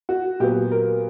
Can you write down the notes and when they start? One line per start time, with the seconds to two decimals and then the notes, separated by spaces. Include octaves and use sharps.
0.09 F#4
0.40 A#2 F#3 B3 G4
0.71 A#4